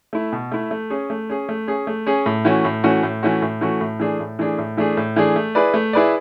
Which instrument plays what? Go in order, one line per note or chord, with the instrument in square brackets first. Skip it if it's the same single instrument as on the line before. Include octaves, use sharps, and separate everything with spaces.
[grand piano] A3 E4
B2
A3 E4
A3
C#4 G#4
A3
C#4 G#4
A3
C#4 G#4
A3
C#4 G#4
A2
E3 A3 C#4 F#4
A2
E3 A3 C#4 F#4
A2
E3 A3 C#4 F#4
A2
E3 A3 C#4 F#4
A2
E3 A3 D4 G#4
A2
E3 A3 D4 G#4
A2
E3 A3 D4 G#4
A2
E3 A3 D4 G#4
A3
E4 G#4 B4 D5
A3
E4 G#4 B4 D5